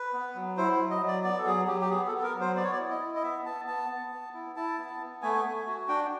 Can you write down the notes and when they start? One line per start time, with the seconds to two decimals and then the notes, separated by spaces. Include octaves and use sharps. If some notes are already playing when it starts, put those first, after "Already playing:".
Already playing: B4
0.13 B3
0.35 F#3
0.57 E4 C5
0.80 F#3
0.91 D#5
1.01 F#3
1.08 D5
1.24 B3 D5
1.38 A4
1.46 F#3 G#4
1.68 F#3 G4
1.81 G4
1.90 B3 G#4
2.07 A4
2.12 B3
2.18 A4
2.23 A#4
2.34 F#3
2.40 C5
2.56 B3 D5
2.64 C#5
2.72 D5
2.79 E4
2.90 D#5
3.01 E4
3.15 D#5
3.23 B3 E5
3.45 B3 A5
3.67 B3 A5
3.90 B3
4.12 B3
4.34 E4
4.56 E4 A5
4.78 B3
5.00 B3
5.22 A3 G#5
5.45 A3
5.67 F#4
5.88 D4 G5